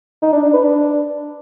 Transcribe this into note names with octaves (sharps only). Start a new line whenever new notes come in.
D#4
D4
D4
B4
D4